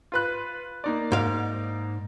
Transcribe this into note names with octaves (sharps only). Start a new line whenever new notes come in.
F4 B4 F#6
A#3 D#4 D5
G#2 F5